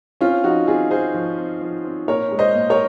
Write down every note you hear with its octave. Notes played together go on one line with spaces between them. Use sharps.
C4 C#4 F4
F3 D#4 F#4
C4 F4 G#4
C4 G#4 C5
F3
C4
F3
C4
A#2 A#4 C#5
G#3
C5 D#5
A#2
A#4 C#5